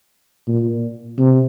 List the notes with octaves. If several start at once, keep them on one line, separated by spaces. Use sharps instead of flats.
A#2
C3